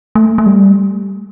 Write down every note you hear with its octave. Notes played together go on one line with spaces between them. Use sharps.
A3
A3
G3